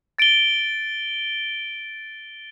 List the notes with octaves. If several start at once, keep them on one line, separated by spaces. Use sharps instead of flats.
A6 D7 G7